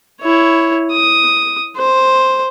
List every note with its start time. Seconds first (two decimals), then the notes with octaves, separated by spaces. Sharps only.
0.22 E4 C#5
0.92 D#6
1.78 C5